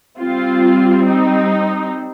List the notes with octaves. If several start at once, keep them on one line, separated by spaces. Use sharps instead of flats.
G3 C4 F4
D#4